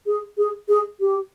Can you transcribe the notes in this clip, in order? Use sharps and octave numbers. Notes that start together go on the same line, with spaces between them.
G#4
G#4
G#4
G4